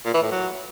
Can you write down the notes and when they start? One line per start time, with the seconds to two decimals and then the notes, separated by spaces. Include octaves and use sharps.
0.05 A#2
0.14 E3
0.23 A2
0.32 F#3